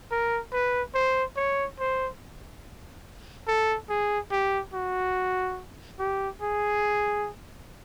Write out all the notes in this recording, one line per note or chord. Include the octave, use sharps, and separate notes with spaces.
A#4
B4
C5
C#5
C5
A4
G#4
G4
F#4
G4
G#4